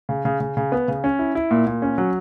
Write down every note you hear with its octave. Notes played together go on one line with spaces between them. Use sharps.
C#3
C#3
C#3
C#3
B3
C#3
C#4
E4
E4
A#2
A#2
C#4
F#3